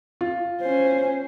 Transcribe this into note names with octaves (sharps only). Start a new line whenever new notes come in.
F4
C#4 C5